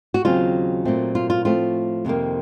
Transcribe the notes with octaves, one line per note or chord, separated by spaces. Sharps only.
F#4
D#2 C#3 F#3 C4 F4
A#2 F#3 A3 C4
F4
F4
A2 F3 A3 C4 F4
F2 C3 D#3 A#3